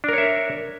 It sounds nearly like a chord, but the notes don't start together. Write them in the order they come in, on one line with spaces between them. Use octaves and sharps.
D4 A#4 C#5 E5